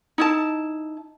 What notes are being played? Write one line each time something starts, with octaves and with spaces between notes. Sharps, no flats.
D#4 E4 A5